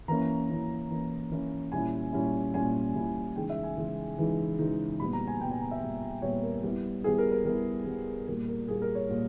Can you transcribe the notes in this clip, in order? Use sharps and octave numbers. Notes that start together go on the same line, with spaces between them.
E3 A#3 C#4 E4 A#5
E3 A#3 C#4 E4
E3 A#3 C#4 E4
E3 A#3 C#4 E4
A#2 G3 C#4 E4 G#5
A#2 G3 C#4 E4
A#2 G3 C#4 E4 G#5
A#2 G3 C#4 E4
C#3 E3 G#3 D#4 G5
E5
G#5
C#3 E3 G#3 D#4
C#3 E3 G#3 D#4
C#3 E3 G#3 D#4
A#2 G3 B3 B5
A#5
G#5
A#2 G3 B3 G5
G#5
A#5
E5
A#2 G3 B3
A#2 G3 B3 C#5
A#4
G3 B3 E4
G3 B3 E4 G#4
A#4
A#4
G3 B3 E4 A#4
G3 B3 E4
A#2 G3 A#3 A#4
A#4
A#2 G3 A#3 G#4
A#4
C#5
A#2 G3 A#3